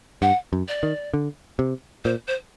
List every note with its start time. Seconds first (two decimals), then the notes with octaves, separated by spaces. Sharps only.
0.22 G2 F#5
0.53 F#2
0.68 D5
0.83 D#3
1.14 D3
1.59 C3
2.04 A#2 C5
2.27 C5